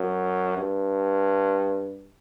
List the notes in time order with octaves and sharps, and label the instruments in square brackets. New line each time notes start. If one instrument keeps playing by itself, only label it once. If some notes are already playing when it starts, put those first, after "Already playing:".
Already playing: [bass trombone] F#2
G2